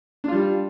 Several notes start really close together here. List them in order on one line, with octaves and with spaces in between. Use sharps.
D4 F4 G3